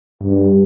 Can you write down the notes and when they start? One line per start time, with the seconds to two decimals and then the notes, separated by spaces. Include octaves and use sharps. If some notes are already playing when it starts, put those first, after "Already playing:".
0.22 G2